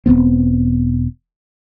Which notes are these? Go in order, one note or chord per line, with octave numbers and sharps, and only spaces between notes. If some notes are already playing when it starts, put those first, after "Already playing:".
E1 A#2 B3 C4